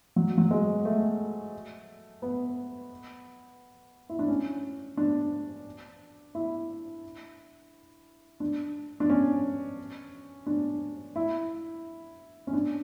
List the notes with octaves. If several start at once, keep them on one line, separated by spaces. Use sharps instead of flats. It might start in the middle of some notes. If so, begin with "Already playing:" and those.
F#3
F#3
G#3
A3
B3
E4
D4
C#4
D4
E4
D4
D4
C#4
D4
E4
C#4
D4